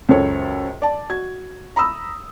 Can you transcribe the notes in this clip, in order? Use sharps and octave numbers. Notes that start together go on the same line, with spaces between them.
C#2 F#2 A4 C5 C#5
D5 A5
F#4 G#6
A#5 B5 D#6 E6